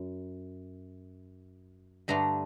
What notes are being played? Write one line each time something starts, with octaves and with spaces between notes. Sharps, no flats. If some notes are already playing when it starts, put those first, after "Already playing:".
Already playing: F#2
G2 D3 A3 D4 A#5